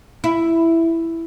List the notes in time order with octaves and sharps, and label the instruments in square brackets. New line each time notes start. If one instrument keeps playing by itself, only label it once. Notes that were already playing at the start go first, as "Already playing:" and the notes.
[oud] E4